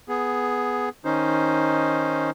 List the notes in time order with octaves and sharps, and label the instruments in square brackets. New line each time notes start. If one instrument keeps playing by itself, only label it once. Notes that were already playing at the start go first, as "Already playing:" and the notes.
[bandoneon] B3 G#4
D#3 C#4 D#4 C5